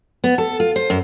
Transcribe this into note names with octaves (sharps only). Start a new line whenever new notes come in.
B3
A4
F4
C5
F#2